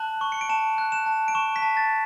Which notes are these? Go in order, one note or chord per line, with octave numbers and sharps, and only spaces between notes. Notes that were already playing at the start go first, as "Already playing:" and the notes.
Already playing: A5 F#6 F#7
C#6
C#7
D7
A5 E7
F#6
E7
A5
D7
C#6 E7
B6
A5
A6